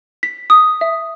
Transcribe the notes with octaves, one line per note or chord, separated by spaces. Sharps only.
B6
D#6
E5